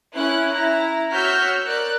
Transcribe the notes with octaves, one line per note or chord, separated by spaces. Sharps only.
C#4 E4 F#6
E4 A#5
F#4 C#5 E6 F6 G6 B6
A#4 D5 F#6